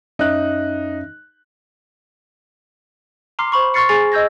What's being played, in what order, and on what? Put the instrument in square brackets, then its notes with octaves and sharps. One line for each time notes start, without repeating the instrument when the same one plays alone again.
[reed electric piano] F#2 C#4 E5 [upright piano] D#4 F#6
[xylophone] A#5 C6 D6 F6 C7
C5 B5 C#6
C6 C#6 F6 A6 C7 C#7
G#4 G#5 C#6 A6 C7 F7
D#5 E6 G6 G#6 A#6